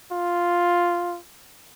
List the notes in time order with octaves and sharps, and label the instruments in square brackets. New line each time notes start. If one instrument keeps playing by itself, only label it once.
[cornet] F4